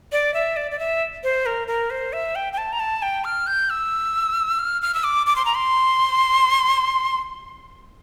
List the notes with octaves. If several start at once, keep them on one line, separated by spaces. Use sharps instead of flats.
D5
E5
D5
D5
E5
C5
A#4
A#4
C5
E5
G5
G5
A5
A#5
A5
G5
F6
G6
E6
F6
F6
E6
D6
D6
C6
A#5
C6